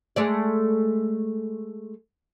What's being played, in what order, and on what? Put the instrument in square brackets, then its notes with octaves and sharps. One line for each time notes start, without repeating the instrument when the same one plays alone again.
[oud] G#3 A3 D5